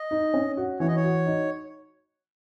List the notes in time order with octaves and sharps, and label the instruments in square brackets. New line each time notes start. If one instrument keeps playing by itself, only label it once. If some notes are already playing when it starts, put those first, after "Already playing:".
Already playing: [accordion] D#5
[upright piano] D#4
C#4
F#4
[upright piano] E3 [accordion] C#5
[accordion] D#5
C#5
[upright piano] F#4
D#4